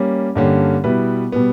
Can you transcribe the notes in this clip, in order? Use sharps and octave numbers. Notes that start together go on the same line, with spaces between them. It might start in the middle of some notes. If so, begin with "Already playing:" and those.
Already playing: G3 A#3 C#4
G2 D3 A#3 C#4 G4
B2 G3 B3 E4 B4
B2 G3 B3